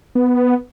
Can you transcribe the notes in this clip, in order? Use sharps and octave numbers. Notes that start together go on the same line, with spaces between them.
B3